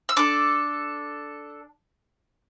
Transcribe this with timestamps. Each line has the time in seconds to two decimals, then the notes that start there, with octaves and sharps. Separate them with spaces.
0.09 E6
0.17 D4 A4 D6